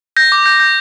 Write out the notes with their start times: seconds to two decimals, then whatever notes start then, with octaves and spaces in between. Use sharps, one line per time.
0.16 G6 A#6
0.32 D6
0.46 G6
0.60 G6